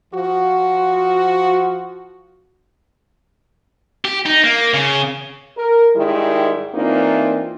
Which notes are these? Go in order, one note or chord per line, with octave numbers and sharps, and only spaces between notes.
F3 F#4
G4
D#4
A#3
C#3
A#4
G#2 D#3 G3 G#3 E4
E3 A#3 C4 D4 D#4 F4